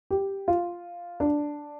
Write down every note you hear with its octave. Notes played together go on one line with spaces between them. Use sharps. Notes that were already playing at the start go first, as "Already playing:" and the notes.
G4
F4
D4